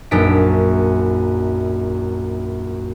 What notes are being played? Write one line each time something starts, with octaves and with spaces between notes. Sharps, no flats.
A#1 F#2 D#4 A5 B6 D7